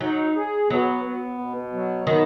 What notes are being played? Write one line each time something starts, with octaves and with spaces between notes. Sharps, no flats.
F#3 D#4
G#4
F#3 B3
B3
B2
F#3
D#3 B3